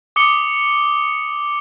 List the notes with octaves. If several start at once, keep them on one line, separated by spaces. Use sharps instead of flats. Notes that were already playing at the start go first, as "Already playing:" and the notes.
D6 D#6 C#7 G7